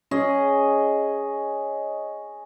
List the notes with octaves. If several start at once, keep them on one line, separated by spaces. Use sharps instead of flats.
C#4 G#4 D#5